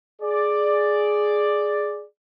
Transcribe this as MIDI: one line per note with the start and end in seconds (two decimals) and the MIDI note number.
0.22 2.05 68
0.22 2.05 74